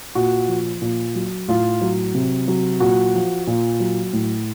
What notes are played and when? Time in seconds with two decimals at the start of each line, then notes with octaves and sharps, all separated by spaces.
0.15 A#2 F#4
0.48 F3
0.82 A#2
1.15 F#3
1.48 A2 F4
1.81 F#3
2.14 C3
2.48 F#3
2.80 A#2 F#4
3.14 F3
3.47 A#2
3.80 F#3
4.13 A2